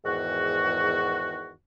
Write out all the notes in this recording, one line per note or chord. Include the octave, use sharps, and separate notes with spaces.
E2 G#2 D#3 F#4